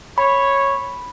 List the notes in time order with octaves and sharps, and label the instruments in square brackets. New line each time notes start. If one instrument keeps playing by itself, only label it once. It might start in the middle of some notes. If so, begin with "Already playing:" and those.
[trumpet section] C#5 [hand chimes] B5